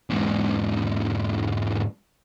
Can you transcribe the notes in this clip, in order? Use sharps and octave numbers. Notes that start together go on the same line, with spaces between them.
E2 G#2